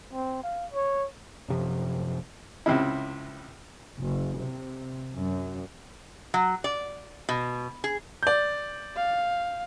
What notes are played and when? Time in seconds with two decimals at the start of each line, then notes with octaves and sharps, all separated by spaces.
0.13 C4
0.43 F5
0.72 C#5
1.48 F#2 C3 F3
2.66 C#2 C3 E4
3.98 F#1
4.38 C3
5.14 F#2
6.34 F#3
6.64 D5
7.29 B2
7.84 G#4
8.23 D5 G6
8.97 F5